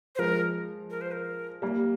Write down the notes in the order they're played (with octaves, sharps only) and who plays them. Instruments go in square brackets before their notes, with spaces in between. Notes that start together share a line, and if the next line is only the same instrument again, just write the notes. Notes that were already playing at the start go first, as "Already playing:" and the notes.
[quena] C5
[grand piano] F3 G#3 [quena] A#4
[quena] A#4
C5
A#4
[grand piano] G3 A#3